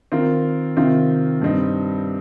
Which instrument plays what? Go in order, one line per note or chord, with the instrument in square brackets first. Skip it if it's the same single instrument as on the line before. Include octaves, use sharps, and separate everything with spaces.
[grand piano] D#3 C4 F4 A#4
C3 D#3 C4 F4
G2 G3 C4 D#4